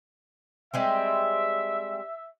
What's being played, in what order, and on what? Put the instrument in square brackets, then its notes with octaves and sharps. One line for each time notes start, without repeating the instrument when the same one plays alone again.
[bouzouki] G3 G#3 C4 [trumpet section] E5